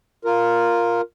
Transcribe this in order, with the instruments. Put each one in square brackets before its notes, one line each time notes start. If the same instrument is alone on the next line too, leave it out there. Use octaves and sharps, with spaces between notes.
[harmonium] F4 A#4